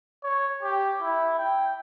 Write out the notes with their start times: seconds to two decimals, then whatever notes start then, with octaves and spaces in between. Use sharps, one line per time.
0.24 C#5
0.63 G4
1.02 E4
1.38 G5